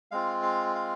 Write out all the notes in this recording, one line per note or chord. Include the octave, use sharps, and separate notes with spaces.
G#3 C4 F4 F5
F5
F5